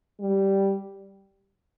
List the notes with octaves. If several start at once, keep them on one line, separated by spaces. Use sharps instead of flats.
G3